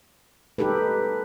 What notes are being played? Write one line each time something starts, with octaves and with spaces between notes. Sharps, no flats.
D#4 G4 A4 B4